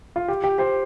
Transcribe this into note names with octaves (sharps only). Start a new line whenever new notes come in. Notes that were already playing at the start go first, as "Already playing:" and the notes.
F4
G4
G4
G4 C5